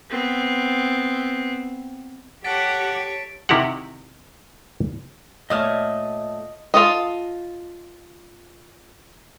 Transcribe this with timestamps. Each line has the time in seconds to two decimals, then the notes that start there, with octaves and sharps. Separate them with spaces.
0.10 B3 C4
2.44 G4 A4 C#5 F#5 A6 B6 D7
3.49 C3 D#3 E4 F#4 G4 F#5
5.50 A#2 A3 C#5 D#5 D#6 F6
6.74 F4 A4 D#5